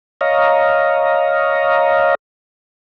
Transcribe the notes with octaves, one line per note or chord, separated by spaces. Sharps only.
C#5 D#5 F5 A#5